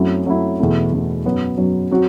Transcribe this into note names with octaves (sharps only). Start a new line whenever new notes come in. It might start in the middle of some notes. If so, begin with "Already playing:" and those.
Already playing: F#2 F#3 A3 C4 E4
F#2 F#3 A3 C4 E4
E2 B2 A3 E4
E2 B2 A3 E4
F#2 F#3 B3
F#2 F#3 B3
F#3 C4 F#4